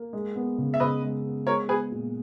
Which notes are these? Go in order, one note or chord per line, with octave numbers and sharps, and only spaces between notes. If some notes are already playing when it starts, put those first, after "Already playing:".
Already playing: A#3
G#3
B3
C#3
E5
C#3 B4 D#5
G#3
B3
G#3 A#4 C#5
B3 G#4 B4
A#2